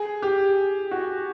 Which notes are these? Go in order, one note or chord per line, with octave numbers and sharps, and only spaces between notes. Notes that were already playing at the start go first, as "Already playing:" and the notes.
Already playing: G#4
G4
F#4